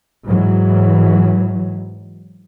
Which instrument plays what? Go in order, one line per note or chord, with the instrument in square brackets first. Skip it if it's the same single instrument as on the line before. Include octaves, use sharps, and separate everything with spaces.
[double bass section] G#2 E3 F#3